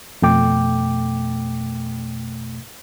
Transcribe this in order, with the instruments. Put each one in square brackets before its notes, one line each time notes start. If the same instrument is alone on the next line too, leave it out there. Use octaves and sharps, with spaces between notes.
[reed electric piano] F2 B2 A3 G5 D6